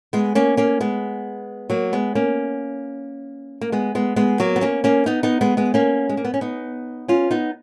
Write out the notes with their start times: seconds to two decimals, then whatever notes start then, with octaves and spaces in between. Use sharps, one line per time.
0.13 G#3 B3
0.35 A#3 C#4
0.57 A#3 C#4
0.81 G#3 B3
1.70 F#3 A#3
1.93 G#3 B3
2.15 A#3 C#4
3.61 A#3
3.72 G#3 B3
3.95 G#3 B3
4.16 G#3 B3
4.40 F#3 A#3
4.56 B3
4.61 A#3 C#4
4.84 A#3 C#4
5.06 B3 D#4
5.23 B3 D#4
5.41 G#3 B3
5.57 G#3 B3
5.74 A#3 C#4
6.09 G#3
6.17 A#3
6.25 B3
6.34 C#4
6.41 B3 D#4
7.08 C#4 F4
7.31 B3 D#4